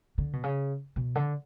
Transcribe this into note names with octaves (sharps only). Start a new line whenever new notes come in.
D3
B2
C#3
B2
D3